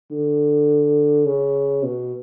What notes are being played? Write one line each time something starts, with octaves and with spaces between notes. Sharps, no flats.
D3
C#3
B2